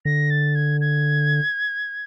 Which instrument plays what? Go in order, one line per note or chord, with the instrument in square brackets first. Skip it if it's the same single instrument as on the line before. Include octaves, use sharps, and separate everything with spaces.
[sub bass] D3 [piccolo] A#6
[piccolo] A6
G#6
G#6